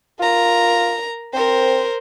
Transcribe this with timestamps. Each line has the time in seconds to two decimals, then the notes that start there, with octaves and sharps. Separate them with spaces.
0.20 F4 A#4 A#5
1.33 C4 A#4 C5